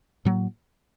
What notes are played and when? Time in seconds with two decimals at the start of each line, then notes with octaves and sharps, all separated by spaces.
0.25 A2 F#3 A#3